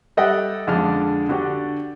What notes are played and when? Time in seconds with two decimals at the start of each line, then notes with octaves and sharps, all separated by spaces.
0.17 G3 A4 D#5 E5 F#5 G5
0.67 F2 D3 G#3 D4 F6
1.29 D3 D4 F#4 G4